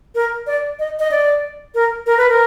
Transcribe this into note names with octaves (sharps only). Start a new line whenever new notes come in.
A#4
D5
D#5
D#5
D5
A#4
A#4
B4
A#4